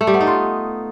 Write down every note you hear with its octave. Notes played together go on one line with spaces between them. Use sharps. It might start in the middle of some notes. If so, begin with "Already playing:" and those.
A3
G3
B3
D#4
F4